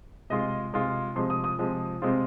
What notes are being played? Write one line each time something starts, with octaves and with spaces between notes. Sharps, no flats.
C3 G#3 F4 D#5
C3 G#3 F4
C3 F3 G#3 C6
D#6
D#6
C3 F3 G#3
C3 G#3 C4 F4